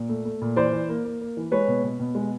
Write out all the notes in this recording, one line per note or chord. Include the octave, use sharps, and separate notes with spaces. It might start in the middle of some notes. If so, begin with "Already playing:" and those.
Already playing: A#2
A3
A3
A#2
E3 C5 D5
E3
A#3
A#3
A#3
E3
G#3 B4 C#5
B2
B2
B2
G#3